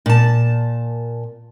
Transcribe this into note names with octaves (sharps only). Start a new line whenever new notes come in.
A#2 A5